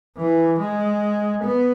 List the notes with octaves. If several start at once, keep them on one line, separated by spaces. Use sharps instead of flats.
E3
G#3
B3